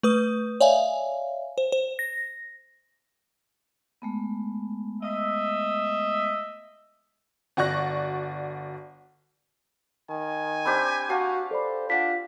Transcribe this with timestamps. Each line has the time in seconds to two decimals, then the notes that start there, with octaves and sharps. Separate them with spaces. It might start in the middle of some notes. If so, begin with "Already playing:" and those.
0.03 A3 B4 D#6
0.61 C#5 D5 E5 F5 G#5
1.58 C5
1.72 C5
1.99 A#6
4.02 G#3 A3 B3
5.02 D#5 E5
7.57 G1 F#4 D5 C#6 F#6 A#6
10.10 D#3 G#5
10.65 C4 D4 G4 B5 G6
11.10 F#4 F5 A5
11.51 A4 C5 D5 B5
11.90 D4 F4 F#5 B6